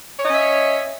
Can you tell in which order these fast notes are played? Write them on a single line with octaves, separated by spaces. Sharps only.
C#5 D#5 C#4 E5